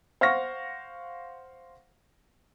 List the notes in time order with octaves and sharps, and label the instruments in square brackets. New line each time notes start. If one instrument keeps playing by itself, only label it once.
[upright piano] C5 F5 F#5 C#6 F6 A#6